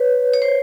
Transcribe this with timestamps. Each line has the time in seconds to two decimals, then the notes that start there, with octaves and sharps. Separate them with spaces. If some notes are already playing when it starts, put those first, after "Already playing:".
Already playing: B4 C#5
0.34 C#5
0.42 C5